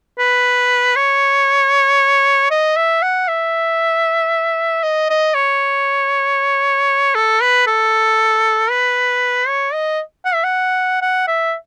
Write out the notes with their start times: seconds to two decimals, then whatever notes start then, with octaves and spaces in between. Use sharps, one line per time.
0.19 B4
0.96 C#5
2.51 D#5
2.77 E5
3.03 F#5
3.28 E5
4.83 D#5
5.10 D#5
5.35 C#5
7.15 A4
7.42 B4
7.67 A4
8.70 B4
9.48 C#5
9.73 D#5
10.25 F#5
10.34 E5
10.44 F#5
11.02 F#5
11.28 E5